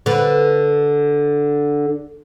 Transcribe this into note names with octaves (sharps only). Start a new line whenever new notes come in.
D3 B4